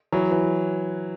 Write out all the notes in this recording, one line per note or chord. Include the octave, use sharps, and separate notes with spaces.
E3 F#3
E3